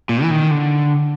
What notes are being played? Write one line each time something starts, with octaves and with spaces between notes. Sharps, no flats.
A#2
E3
D#3
D3